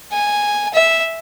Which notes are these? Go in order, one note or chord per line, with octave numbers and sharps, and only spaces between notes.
G#5
E5